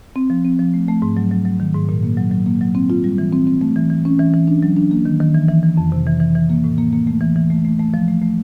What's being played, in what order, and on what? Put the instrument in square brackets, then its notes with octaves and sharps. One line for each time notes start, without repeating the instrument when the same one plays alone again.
[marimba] C4
F3
C4
F3
A3
A3
G#2
F#3
F#3
F#3
D#3
G#2
A#2
A#3
F#3
F#3
A#3
F#3
C4
F4
G3
E3
C4
C4
A3
E3
E3
C#4
E3
E3
D4
F#3
D4
A#3
D#3
D#3
E3
E3
E3
F2
C3
E3
E3
E3
A#3
A2
A#3
A#3
A3
E3
E3
A3
A3
A3
F3
A3
A3